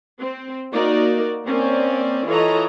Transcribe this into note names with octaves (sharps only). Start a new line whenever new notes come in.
C4
A#3 D#4 F#4 A#4 D5
A#3 C4 C#4 D5
E3 F4 A4 C#5 D#5 A#5